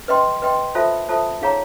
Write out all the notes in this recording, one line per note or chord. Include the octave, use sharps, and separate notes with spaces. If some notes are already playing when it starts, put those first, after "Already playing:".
B4 D#5 G5 C6
B4 D#5 G5 C6
F4 A4 C5 E5 A5
F4 A4 C5 E5 A5
D#4 G#4 C#5 F5 A#5